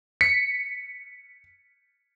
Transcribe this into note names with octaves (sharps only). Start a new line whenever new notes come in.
B6 C#7